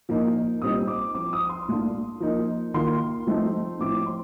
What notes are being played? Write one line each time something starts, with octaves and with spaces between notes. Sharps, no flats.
A#2 F3 A#3 D#4
A#2 G3 C4 D#4 D#6
D6
F3 C4 F4 D6
D#6
C6
A#2 A3 D4 F4
F3 A#3 D#4
D#3 A#3 F4 C6
F3 A3 C4 D#4
A2 F3 C4 D6
C6